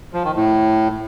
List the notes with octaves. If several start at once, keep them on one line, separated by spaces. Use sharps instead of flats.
F3
D#3
A2